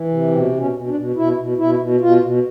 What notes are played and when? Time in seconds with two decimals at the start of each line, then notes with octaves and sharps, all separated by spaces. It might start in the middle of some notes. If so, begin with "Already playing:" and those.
Already playing: E3
0.09 C3
0.31 B2 C4
0.51 B2
0.58 C#4
0.73 B2
0.87 D4
0.94 B2
1.16 B2 E4
1.37 B2
1.58 B2 E4
1.79 B2
2.00 B2 F4
2.22 B2